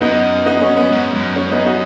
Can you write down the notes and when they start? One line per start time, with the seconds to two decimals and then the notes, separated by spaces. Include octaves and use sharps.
0.01 F#2 B3 D#4
0.46 B3 D#4
0.62 C#4
0.77 B3
0.91 G#2
1.14 F#2
1.36 C#4
1.51 B3 D#4
1.66 D#4 F#4